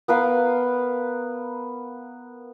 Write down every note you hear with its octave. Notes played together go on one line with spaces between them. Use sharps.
B3 A#4 B4 F5